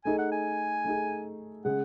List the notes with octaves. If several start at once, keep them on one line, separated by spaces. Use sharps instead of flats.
A3 D#4 G#4 G#5
F#5
G#5
A3 D#4 G#4
C#3 G#3 C#4 G#4 F#5